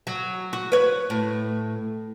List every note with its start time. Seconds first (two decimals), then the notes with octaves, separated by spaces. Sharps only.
0.07 F#3
0.53 F#4
0.72 B4 C#5
1.10 A2